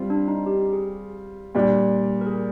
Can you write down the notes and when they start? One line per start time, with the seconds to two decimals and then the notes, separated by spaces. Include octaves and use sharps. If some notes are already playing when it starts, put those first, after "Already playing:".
Already playing: G3 C4 F4
0.10 D4
0.28 D#4
0.46 G4
0.73 G#4
1.55 A#2 G3 D4
2.21 A#4
2.26 G#4